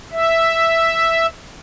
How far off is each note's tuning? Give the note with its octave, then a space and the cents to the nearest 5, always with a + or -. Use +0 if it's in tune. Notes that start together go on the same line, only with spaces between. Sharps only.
E5 +0